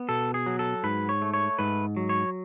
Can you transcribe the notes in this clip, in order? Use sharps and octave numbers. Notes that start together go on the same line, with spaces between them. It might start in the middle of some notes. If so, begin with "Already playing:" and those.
Already playing: B3
B2 A4
G#4
F#3
A4
G#2 B4
C#5
A3
C#5
G#2 B4
F#3
C#5